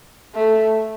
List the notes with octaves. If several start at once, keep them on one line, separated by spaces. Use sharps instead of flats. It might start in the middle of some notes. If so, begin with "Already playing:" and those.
A3